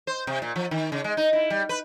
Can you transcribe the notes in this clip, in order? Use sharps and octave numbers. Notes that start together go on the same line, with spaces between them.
C5
C3
A#2
F3
D#3
C#3
G#3
D#4
E4
G3
B4